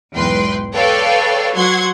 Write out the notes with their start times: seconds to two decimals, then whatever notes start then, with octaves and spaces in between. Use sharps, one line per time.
0.14 B1 E2 G#2 B4 G5 C6
0.74 A4 B4 C#5 D5 F5 G5
1.55 F#3 F#5 C6 G#6